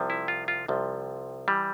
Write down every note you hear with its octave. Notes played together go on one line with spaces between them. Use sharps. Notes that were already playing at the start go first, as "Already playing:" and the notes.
Already playing: C2 C3 F3
E4
F4
F4
C2 C3 F3
E3 G3